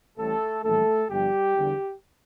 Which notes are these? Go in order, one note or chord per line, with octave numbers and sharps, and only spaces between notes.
A1 A2 E3 G3 A3 A4
A#1 A2 E3 G3 A3 A4
G1 G2 F3 G3 G4
E2 D3 G3